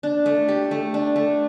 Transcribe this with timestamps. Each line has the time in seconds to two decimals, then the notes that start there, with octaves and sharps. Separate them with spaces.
0.03 D4
0.26 A3
0.48 G4
0.71 A3
0.94 D4
1.16 A3